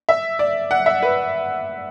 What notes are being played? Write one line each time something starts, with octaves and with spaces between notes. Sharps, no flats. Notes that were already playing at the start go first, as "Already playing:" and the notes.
E5
D5
F#5
E5
B4